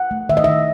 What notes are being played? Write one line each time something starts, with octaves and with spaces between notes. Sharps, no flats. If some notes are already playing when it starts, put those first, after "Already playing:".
Already playing: F#5
A3
D#3 E5
D#5
D#3 E5